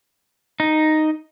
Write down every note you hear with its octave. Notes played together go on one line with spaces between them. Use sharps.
D#4